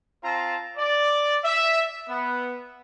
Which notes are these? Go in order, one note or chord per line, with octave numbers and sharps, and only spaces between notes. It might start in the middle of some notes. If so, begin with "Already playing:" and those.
C4 F4 A5 A#5
D5
E5
B3